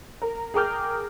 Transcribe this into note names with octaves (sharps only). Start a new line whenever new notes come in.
A#4
G#4 A#4 G5 D6 F6 G6